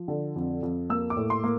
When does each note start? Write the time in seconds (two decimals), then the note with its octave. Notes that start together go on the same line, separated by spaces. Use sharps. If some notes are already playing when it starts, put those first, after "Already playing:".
Already playing: F3
0.08 D3
0.36 F2
0.63 F2
0.90 A#3 E6
1.10 D6
1.17 A2
1.30 C6
1.44 A#3